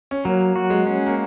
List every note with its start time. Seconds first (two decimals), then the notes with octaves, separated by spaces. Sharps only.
0.11 C#4
0.25 F#3 A#3
0.56 F#4
0.70 G#3
0.87 C#4
1.06 A#3